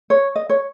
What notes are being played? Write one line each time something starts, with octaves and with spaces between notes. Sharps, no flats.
C#5
D#5
C#5